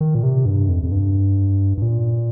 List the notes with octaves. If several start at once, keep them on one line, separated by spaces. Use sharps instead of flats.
D#3
A#2
C3
G2
F2
F2
G2
G2
A#2